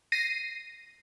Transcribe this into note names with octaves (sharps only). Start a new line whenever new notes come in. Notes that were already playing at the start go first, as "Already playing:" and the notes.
A#6 C7 D#7